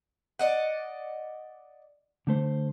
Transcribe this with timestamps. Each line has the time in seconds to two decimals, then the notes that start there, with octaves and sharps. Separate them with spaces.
0.39 D5 D#5 F#5
2.27 D3 A3 C5